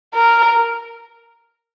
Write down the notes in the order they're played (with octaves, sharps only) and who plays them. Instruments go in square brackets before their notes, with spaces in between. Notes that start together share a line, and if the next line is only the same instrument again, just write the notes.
[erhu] A#4